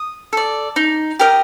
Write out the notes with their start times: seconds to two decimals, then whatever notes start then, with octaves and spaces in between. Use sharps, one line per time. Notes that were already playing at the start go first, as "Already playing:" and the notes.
Already playing: D#6
0.33 A4 D5
0.76 D#4
1.19 G4 A#4 D#5